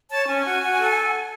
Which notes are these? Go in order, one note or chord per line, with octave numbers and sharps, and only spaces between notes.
C#5 A5
C#4 G#5
F#4
F#4
A4